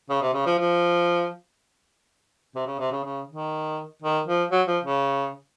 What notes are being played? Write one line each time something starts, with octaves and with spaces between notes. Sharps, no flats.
C#3
C3
C#3
F3
F3
C3
C#3
C3
C#3
C#3
D#3
D#3
F3
F#3
F3
C#3